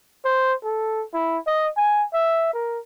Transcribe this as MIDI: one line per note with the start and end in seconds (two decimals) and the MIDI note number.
0.25 0.54 72
0.64 1.05 69
1.13 1.38 64
1.47 1.68 75
1.77 2.04 80
2.13 2.51 76
2.54 2.79 70